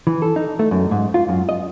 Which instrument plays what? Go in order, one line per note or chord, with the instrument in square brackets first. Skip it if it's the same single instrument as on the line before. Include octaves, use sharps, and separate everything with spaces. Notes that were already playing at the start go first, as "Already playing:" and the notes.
[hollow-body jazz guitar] E3
A4
D#4
A3
F#2
G#2
F4
F#2
D#5